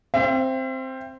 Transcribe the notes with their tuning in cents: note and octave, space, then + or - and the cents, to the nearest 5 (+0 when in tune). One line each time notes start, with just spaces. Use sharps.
C4 +5 E5 +40